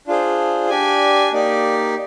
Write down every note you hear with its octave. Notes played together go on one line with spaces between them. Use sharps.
D4 F4 G#4 C5
D4 G4 D5 G#5
A#3 D#4 G4 D5